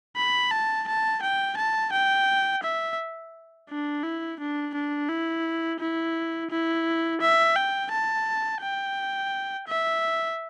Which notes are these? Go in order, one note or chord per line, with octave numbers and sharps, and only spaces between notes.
B5
A5
A5
G5
A5
G5
E5
D4
E4
D4
D4
E4
E4
E4
E5
G5
A5
G5
E5